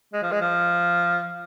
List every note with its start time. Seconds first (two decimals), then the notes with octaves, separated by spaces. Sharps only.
0.13 G#3
0.23 F3
0.32 G#3
0.41 F3